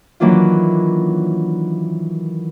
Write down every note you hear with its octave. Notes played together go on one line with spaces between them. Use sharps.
D#3 E3 F#3 A#3 D4 F4